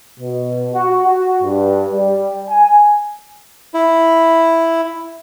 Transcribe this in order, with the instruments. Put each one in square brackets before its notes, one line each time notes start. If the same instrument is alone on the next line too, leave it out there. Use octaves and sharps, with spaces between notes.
[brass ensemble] B2
F#4
F#4
G2
G3
G#5
[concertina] E4